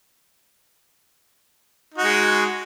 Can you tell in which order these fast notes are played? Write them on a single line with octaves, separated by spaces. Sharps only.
D#4 F#4 G#3